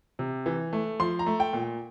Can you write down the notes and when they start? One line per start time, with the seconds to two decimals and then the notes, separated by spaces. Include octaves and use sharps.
0.19 C3
0.46 E3
0.73 A3
0.99 F3 C6
1.19 A#5
1.26 A3
1.40 G5
1.53 A#2